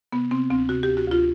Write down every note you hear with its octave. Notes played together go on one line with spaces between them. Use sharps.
C3 B3
C3 C4
D2 C4
C3 F#4
G4
D2
F#4
D2 F4